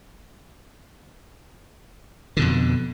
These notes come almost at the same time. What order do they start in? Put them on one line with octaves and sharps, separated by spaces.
D3 B2 F2